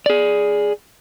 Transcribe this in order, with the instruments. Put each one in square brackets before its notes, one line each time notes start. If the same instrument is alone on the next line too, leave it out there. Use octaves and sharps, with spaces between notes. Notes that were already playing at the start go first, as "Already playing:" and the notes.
[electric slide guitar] G#4 D5